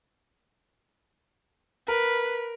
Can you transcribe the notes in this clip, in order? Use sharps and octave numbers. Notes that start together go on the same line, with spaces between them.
A#4 B4